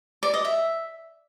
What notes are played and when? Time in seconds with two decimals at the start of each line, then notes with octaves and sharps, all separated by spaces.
0.23 D5
0.34 D#5
0.45 E5